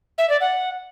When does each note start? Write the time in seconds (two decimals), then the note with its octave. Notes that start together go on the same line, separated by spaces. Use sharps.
0.18 E5
0.29 D5
0.41 F#5